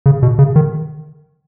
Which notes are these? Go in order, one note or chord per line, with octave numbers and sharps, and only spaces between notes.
C#3
B2
C#3
D#3